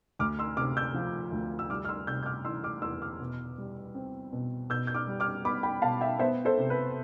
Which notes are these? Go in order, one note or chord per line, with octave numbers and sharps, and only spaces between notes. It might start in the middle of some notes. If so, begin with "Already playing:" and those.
D2 D6 F6
C6 E6
C3 D6 F6
E6 G6
F3
D2
E6
G3 D6 F6
F6
C6 E6
C3 E6 G6
G6
D6 F6
E3 C6 E6
D6 F6
E2 C6 E6
D6 F6
B2
G3
C4
B2
B2 E6 G6
G6
D6 F6
G3
D6 F6
B3 B5 D6
G5 B5
B2 F5 A5
E5 G5
B3 C5 E5
A4 C5
C3
B4